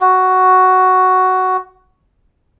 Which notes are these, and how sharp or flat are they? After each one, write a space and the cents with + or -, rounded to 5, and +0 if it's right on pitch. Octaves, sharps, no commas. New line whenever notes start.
F#4 +5